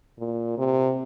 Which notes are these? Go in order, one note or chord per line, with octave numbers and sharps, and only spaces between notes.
A#2
C3